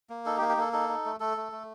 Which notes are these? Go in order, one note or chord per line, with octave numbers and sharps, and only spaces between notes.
A#3
D#4 A4
G4
A#3
G4
A#3 A4
D#4 A4
D#4
A3
A3 A4
A3
A3